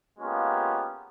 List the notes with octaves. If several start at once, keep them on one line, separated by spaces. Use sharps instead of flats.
G#3 A#3 B3 C#4 F4 G4